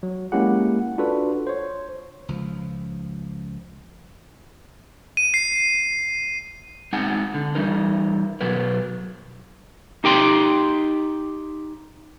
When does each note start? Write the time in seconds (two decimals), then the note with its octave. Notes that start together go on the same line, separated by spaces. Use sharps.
0.03 F#3
0.32 G#3 A#3 C#4 E4 G4 F#5
0.98 D4 F4 F#4 A4 B4 D5
1.47 C5 C#5
2.28 C#2 F3
5.17 D#7
5.34 C7
6.93 G#3 C4 D#4 F#5 G#5
7.34 D3
7.55 E3 G3 D#4 A#4
8.41 B2 F#3 A#4 B4
10.04 D#4 G4 G5 C6